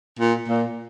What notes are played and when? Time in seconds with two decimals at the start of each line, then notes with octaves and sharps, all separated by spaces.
0.19 A#2
0.49 A#2